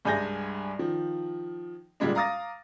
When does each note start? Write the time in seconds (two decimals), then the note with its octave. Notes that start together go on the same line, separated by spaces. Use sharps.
0.05 C2 G2 G#3 G#5 G6 A#6
0.79 D#3 F3
2.00 A#2 D3 G3 G#3 D4
2.15 F5 A#5 D6 D#6 A6 A#6